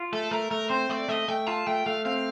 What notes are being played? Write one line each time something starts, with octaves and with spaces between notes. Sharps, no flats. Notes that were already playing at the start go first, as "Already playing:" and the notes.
Already playing: F4
A3 A4
A3 A#4
A3 A#4
C4 C5
A3 D5
A3 D#5
A3 G5
F4 A5
A3 G5
A3 F5
C4 F5